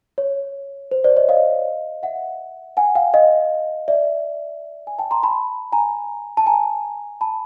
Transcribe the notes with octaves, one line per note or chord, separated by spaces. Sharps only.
C#5
C5
C5 D5
C#5 D#5
D#5 F5
E5 F#5
F#5 G#5
F5 G5
D#5 F5
D5 E5
G#5
G5 A5
A#5 C6
A5 B5
G#5 A#5
A5
G#5 A#5
A5 B5